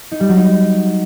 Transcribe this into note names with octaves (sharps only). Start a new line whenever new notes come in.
D#4
G3
F#3
D#4